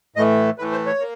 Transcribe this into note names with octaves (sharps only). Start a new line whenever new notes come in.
A2 E3 A3 D#5
A2 E3 A3 B4
C5
C#5
A#3